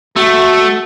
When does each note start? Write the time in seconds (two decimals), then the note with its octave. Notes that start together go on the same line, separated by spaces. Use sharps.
0.16 A3 F#4